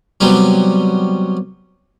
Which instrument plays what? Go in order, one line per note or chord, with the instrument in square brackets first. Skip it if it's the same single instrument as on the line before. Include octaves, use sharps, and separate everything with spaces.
[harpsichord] C3 F#3 G3 B3 C#4